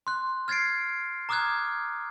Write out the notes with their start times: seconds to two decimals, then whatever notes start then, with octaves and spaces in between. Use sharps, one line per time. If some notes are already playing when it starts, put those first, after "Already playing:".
0.07 C6 F#6
0.48 F6 G#6 A6 C7 D7
1.29 A#5 D6 D#6 F6 F#6 G#6